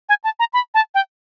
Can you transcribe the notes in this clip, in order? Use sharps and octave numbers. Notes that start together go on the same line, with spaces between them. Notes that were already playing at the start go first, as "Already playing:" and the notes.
G#5
A5
A#5
B5
A5
G5